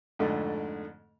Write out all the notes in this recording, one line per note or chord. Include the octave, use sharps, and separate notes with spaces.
F2 G#2 D3 A3